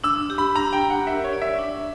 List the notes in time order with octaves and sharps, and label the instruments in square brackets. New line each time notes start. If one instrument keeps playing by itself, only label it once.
[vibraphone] D4 [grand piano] E6
[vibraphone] G4
[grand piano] B5
[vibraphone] D4 [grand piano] A#5
[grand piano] G5
[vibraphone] G4
[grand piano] F#5
[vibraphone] A#4 [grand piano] E5
[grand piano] C#5
[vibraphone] D5
[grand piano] E5
[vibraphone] D4